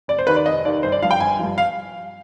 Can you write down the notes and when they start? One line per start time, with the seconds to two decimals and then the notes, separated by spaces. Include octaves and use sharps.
0.08 F1 D5
0.19 C5
0.27 D#2 D#3 B4
0.36 D5
0.46 F1 D#5
0.65 D#2 D#3 D5
0.83 G1 C5
0.92 D5
1.02 G2 F3 F5
1.11 G5
1.20 G1 G#5
1.39 G2 F3
1.58 F5